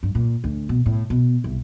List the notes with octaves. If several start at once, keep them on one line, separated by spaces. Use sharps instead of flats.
G2
A#2
D2
B2
A2
B2
C2